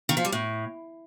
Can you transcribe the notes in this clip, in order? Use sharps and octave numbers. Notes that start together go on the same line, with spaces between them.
D#3
F3
G3
A2